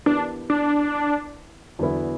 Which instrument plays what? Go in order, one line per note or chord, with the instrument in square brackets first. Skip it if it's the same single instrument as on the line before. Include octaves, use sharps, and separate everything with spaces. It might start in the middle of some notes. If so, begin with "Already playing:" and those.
[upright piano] E3 B3 E4 G4 A#4 [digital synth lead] D4
[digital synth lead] D4
[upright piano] E2 D3 F#3 B3 E4